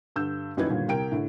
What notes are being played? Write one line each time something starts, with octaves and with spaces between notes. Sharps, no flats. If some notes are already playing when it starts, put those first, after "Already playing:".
G2 D3 E6 G6
D#1 F#2 D#4 E4 B4 G#6
G1 D#2 A#2 D3
C2 A#4 G5 D7
A2 D3